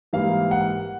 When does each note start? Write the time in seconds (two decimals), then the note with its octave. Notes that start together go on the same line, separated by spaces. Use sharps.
0.13 G#2 E3 G3 A#3 F5
0.51 F#5